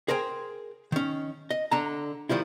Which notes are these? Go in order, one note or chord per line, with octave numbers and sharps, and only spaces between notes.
G#4 A#4 C5 G5 G#5
D#3 C#4
D#5
D3 A5 A#5
D#3 F3 G3 E4